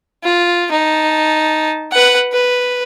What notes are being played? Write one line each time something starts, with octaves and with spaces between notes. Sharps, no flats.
F4
D#4 A5
B4 F#5
B4